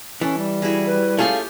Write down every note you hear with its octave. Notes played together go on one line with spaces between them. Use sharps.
E3 C#4 A4
G3
E4 F#4 G#4
B4
A3 C#4 F4 G4 G#4 F5 C6